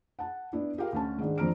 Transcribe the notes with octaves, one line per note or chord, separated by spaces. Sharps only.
F#5 A5
B3 D4 E4
F4 G4 G#4 A#4 F5
D2 C#4 A5
G#2 D#3 D4
F2 D4 C5 A#5 F6 D7